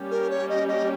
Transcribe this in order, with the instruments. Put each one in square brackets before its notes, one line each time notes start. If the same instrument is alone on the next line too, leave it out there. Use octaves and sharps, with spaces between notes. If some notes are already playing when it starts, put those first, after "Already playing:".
Already playing: [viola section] G3 A#3 C#4 G4
[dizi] A#4
C#5
D#5
D#5